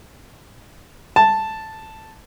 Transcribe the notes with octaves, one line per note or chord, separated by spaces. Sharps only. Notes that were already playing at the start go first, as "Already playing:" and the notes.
A5